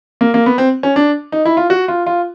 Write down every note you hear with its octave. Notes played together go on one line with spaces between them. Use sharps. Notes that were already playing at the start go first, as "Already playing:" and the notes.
A#3
A#3
B3
C4
C#4
D4
D#4
E4
F4
F#4
F4
F4